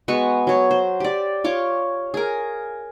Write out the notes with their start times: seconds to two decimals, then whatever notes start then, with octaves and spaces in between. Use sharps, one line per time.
0.08 G#3 B3 F#4 C#6
0.47 F#3 C#5
0.71 C5
1.00 G4 D5
1.44 F4 C#5 D6
2.14 G#4 A#4